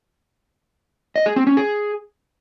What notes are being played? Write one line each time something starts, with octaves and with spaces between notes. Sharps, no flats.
D#5
G#4
C4
C#4
G#4